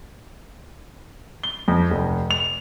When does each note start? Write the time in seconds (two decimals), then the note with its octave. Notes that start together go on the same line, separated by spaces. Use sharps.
1.43 G7
1.68 F2
1.91 F1
2.31 F7